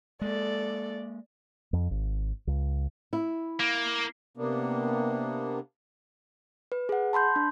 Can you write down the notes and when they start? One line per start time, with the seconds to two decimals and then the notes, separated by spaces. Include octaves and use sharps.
0.21 G#3 A#3 A4 D5
1.73 F2
1.91 G#1
2.47 C#2
3.13 E4
3.60 A#3
4.37 C3 A#3 B3 D4
6.72 B4
6.89 G#4 F#5
7.13 A5 B5 C6 G6
7.36 D4